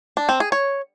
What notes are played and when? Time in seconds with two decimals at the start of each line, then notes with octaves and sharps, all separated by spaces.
0.17 D4
0.29 C4
0.40 G#4
0.52 C#5